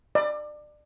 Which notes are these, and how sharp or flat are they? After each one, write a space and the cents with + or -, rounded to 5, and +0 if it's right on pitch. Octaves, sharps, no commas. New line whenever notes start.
D5 +25